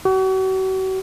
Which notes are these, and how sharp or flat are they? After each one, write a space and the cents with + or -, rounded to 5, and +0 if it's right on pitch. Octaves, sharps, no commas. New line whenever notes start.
F#4 +40